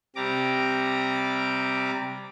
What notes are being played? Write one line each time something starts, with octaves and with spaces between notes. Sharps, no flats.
C3 G3 A#5 D6